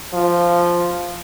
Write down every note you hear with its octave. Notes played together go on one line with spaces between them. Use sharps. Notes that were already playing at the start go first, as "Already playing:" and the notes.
F3